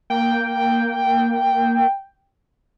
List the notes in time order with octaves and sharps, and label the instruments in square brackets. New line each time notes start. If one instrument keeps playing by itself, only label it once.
[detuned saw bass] A#3 [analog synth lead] G5